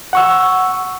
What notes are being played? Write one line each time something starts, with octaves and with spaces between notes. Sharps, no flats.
F#5 C#6 E6